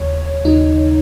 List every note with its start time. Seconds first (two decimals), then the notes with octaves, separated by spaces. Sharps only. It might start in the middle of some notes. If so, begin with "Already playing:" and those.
Already playing: D#2 C#3 F#3 C#5
0.45 D#2 C#3 F#3 D#4